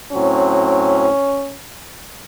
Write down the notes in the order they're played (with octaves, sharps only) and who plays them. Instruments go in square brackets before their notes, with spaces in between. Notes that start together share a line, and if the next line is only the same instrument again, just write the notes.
[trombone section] A2 F#3 C4 [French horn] C#4